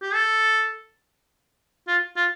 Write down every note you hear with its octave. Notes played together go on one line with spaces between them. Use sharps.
G4
A4
F4
F4